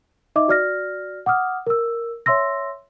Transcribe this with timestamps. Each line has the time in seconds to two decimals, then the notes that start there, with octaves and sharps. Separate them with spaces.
0.36 D#4 D#5 E5 D6
0.48 F#4 D5 F6 A#6
1.26 F#5 D6 D#6 F6
1.67 A#4 E6
2.26 C#5 E5 C6 E6 A#6